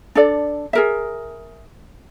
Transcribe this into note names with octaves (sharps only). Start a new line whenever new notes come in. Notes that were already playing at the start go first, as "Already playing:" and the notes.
D4 A4 D5
G#4 A#4 E5